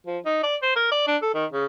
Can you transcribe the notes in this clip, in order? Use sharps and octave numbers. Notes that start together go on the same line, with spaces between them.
F3
D#4
D5
C5
A#4
D5
D4
A4
D#3
C#3